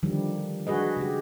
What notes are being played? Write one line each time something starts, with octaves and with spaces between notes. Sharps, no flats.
D3 D#3 F3 G3
G#3 D4 F#4 G#4 B4 D#5
C#3 G#3 G4